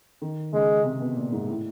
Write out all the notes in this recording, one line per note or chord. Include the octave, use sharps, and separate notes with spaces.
D#3
C#3 G#3
C3
B2
A#2
G#2
A2